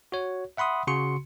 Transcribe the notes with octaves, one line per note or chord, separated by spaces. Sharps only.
F#4 C#5
E5 F#5 B5 C6 D#6
C#3 F#4 C6 C#7